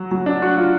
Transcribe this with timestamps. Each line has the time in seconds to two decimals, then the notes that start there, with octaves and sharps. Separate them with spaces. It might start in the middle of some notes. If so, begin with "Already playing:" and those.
Already playing: F#3
0.11 F#3
0.26 D4
0.42 F#4
0.57 F4